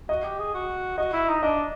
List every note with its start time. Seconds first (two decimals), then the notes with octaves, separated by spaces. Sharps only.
0.09 F#4 D#5
0.24 G4
0.39 G#4
0.54 F#4
0.98 F#4 D#5
1.13 E4
1.28 D#4
1.43 D4 D#5